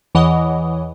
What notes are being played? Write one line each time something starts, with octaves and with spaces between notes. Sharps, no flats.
E2 E3 C#5 D#5 F#5 D#6